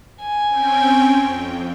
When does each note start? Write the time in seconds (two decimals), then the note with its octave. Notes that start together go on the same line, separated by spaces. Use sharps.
0.21 G#5
0.49 C4 C#4 G5
1.24 F2